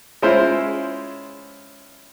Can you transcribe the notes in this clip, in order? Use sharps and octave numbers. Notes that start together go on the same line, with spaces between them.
G#3 C#4 E4 F4 C5